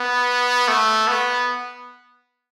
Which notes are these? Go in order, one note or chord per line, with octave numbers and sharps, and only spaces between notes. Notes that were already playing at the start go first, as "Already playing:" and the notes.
Already playing: B3
A3
B3